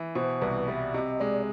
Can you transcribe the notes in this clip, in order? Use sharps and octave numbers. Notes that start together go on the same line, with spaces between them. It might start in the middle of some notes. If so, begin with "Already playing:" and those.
Already playing: E3
B2 C5
C2 B4
G3 E5
C3 D#5
G#3 D5